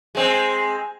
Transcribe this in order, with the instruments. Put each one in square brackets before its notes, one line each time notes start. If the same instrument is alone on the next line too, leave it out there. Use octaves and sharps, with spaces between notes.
[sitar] G#3 C4